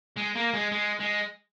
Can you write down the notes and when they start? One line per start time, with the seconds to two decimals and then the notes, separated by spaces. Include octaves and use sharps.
0.16 G#3
0.35 A#3
0.54 G#3
0.72 G#3
1.00 G#3